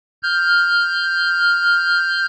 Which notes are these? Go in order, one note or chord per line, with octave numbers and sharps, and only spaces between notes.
F6 G6